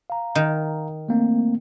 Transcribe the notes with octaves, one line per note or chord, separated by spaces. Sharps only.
F5 A#5
D#3
A3 A#3 C4